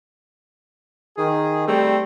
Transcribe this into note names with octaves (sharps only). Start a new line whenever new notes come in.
D#3 G#4
G3 A3 C4